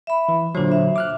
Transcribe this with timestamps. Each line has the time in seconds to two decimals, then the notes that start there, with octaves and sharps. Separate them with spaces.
0.07 E5 B5
0.29 E3
0.55 A#2 D3 F#3 D4 F4 C5
0.72 E5
0.96 D6 F6 F#6